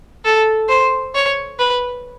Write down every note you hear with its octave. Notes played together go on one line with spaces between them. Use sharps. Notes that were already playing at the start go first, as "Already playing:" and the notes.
A4
C5
C#5
B4